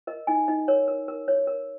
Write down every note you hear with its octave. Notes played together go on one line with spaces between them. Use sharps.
A#4 D#5
D#4 D#5 G#5
D#4 D#5
A#4 C#5
A#4
A#4
C#5
A#4